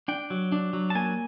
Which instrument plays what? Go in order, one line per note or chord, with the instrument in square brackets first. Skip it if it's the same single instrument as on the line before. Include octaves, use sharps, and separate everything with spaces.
[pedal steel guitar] D4 G5
F#3
D4
F#3
A5
A#3 G#5